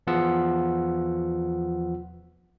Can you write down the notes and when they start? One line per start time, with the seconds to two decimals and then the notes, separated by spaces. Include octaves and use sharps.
0.07 E2 F3 B3 F4 F#5 E6